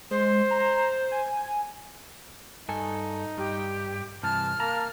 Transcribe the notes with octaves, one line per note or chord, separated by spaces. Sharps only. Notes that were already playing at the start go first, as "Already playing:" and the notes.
G#3 C5
A#5
G#5
G2 D#4 A4 G#5
G2 G4
G2 C3 E3 A5 F6
A#3 A5 A#5